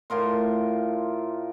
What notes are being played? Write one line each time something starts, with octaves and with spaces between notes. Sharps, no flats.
A2 F4 A#4 C6